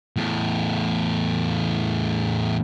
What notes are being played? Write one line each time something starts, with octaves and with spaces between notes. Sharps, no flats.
E2 A2